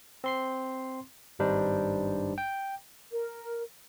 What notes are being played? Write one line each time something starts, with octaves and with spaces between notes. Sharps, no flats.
C4 C6 C7
G#1 G2 G3 D4 D#4 C5
G5
A#4